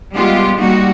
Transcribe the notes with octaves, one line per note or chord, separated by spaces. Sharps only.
G3 G#3 B3 F4 G4
G3 A#3 D#4 F#4